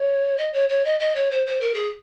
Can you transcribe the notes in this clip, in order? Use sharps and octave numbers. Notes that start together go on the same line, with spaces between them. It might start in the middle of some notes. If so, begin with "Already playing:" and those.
Already playing: C#5
D#5
C#5
C#5
D#5
D#5
C#5
C5
C5
A#4
G#4